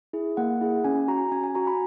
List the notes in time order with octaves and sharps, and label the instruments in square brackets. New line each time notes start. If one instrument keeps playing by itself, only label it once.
[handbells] E4 G#4
A#3 F#5
E4 G#4
C#4 G#5
F#4 A#5
C#4 G#5
G#5
F#4 A#5
B5